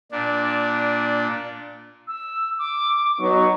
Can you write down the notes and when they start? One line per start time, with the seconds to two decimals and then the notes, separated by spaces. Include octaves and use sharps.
0.12 A#2 D4
2.08 E6
2.59 D6
3.19 F#3 B3 D#4 C#6